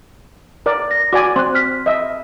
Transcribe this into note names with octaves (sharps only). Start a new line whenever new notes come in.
A#4 D5
A#6
F#4 D5 G#5 D6
C4 C6 F#6
F6 B6
D#5 E5